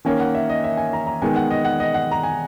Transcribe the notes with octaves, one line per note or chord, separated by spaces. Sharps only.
D#3 A#3 C#4 G#5
F#5
E5
D#5
E5
G#5
A#5
A#5
D#3 G#3 B3 G#5
F#5
D#5
F#5
D#5
F#5
A#5
G#5